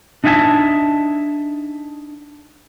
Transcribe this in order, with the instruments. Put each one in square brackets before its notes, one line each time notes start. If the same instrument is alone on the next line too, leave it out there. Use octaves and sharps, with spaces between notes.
[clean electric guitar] D4 D#4 E5 F#5 G#5 A5